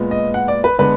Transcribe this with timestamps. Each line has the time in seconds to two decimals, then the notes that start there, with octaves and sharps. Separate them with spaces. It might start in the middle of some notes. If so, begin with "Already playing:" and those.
Already playing: A#2 G#3 B3
0.11 D#5
0.34 F#5
0.48 D5
0.64 B4
0.79 D3 G#3 B3 B4